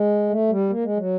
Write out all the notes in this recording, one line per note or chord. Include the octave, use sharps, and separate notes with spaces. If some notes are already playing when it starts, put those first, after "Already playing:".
Already playing: G#3
A3
G3
A#3
G#3
F#3